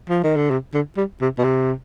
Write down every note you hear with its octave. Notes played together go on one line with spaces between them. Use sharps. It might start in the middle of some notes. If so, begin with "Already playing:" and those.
F3
D#3
D3
C3
D3
G3
C3
B2
C3